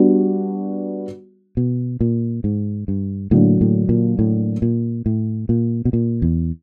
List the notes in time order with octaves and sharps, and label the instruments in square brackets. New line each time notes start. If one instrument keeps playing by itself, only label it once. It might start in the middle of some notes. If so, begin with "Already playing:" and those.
Already playing: [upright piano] G3 B3 D4 F#4
[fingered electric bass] B2
A#2
G#2
G2
[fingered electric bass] A2 [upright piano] D3 F#3 A#3 D4
[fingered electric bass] A2
A#2
A2
A#2
A2
A#2
B2
A#2
E2